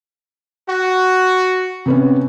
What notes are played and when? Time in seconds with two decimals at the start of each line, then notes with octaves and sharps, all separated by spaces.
0.68 F#4
1.86 C3 B3 C#4